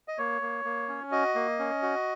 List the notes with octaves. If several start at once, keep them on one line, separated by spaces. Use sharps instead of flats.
D#5
A#3 C#5
A#3
A#3
C#4
F#4 D#5
A#3
C#4
F#4